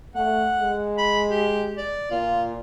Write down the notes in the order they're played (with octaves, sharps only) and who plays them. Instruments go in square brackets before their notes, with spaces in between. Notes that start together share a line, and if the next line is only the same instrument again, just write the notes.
[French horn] A3 [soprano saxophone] F#5
[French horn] G#3
[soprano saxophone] B5
G4
D5
[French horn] A#2 [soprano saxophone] F4